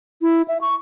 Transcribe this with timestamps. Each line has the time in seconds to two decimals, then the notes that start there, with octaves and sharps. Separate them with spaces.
0.22 E4
0.48 E5
0.61 C#6